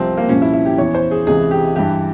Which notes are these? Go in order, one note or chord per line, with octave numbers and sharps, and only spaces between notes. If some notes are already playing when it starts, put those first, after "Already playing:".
Already playing: C2 C3 F3 C4
A#3
C2 A#2 F3 C#4
E4
E4
G4
E2 E3 C#5
C5
G#4
C#2 C3 E3 G#4
G4
G2 E3 G4